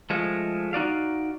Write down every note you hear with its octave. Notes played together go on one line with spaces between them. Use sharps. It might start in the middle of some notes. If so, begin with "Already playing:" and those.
F3 G#3 A3
D#4 F#4 D5 F5